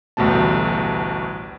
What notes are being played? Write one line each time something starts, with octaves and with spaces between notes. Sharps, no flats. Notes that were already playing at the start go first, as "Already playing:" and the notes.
A1 D2 G2 B2 A3 A5